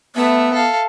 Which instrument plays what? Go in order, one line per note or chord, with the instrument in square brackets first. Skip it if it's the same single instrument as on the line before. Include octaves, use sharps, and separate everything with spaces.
[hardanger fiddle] A3 E5 [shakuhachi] B3
[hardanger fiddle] A4 F5